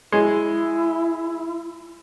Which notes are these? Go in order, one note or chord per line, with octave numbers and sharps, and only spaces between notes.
G#3 E4